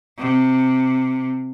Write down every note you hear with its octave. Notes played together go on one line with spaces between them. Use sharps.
C3